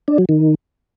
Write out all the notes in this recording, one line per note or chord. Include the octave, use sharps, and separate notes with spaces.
D4
F#3
D#3